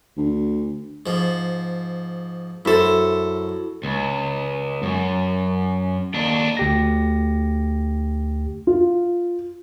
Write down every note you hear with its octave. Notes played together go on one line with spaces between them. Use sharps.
D2
G#2 F3
F#2 E4 A4 C5
C#2
F#2
D#2 D4
D2 G4 A#6
F4